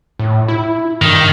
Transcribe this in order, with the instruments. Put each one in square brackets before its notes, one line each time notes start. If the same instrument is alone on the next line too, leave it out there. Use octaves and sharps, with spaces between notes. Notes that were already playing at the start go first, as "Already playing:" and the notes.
[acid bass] A2
E4
[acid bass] G2 [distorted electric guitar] D#3